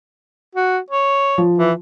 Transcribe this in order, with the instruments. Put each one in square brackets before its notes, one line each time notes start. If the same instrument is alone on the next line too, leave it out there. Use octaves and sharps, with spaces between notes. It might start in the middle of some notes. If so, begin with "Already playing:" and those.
[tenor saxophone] F#4
C#5
[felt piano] F3
[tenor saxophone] E3